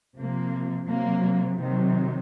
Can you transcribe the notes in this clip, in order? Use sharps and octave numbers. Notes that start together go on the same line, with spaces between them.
C3 F3 A#3
C3 F#3 A#3
C3 D#3 F#3